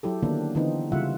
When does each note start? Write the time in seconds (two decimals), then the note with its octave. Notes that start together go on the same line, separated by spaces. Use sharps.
0.03 F#3 E4 G4 A4
0.23 D3 D#3 A#3 B3 D4
0.55 D3 E3 B3 C4 D#4
0.92 C#3 G3 F4 E5 F#5